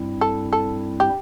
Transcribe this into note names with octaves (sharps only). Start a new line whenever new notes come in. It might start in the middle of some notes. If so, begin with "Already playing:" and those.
Already playing: G2 G3 C4 E4
A4
A4
G4